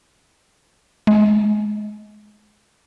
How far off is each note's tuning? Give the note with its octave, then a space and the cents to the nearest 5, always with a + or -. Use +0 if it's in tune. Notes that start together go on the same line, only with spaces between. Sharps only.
G#3 +20